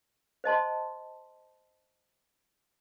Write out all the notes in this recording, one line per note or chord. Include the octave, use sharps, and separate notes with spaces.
C5 D#5 A5 C6